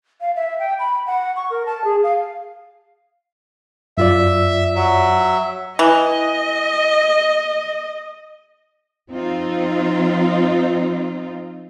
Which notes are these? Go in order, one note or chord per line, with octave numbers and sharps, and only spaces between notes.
F5
E5
G5
B5
F#5
C#6
A#4
A5
G#4
F5
F#2 F4 D5 E5
F#3 E5
E3 D#5
F3 C4 D#4 F4